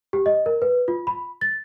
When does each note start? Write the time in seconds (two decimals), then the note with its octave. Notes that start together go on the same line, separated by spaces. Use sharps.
0.13 G4
0.26 D#5
0.46 A#4
0.62 B4
0.88 F4
1.07 B5
1.41 A6